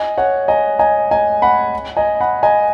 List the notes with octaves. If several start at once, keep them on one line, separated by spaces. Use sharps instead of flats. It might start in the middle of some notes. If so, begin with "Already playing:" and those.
Already playing: D#5 G#5
C#5 F#5
D#5 G#5
D#5 G#5
D#5 G#5
F#5 B5
D#5 G#5
F#5 B5
D#5 G#5